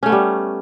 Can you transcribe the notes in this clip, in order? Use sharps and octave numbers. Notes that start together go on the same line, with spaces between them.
G3 A3 B3 C#4